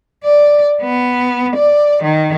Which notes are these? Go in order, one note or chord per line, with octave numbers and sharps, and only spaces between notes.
D5
B3
D5
D#3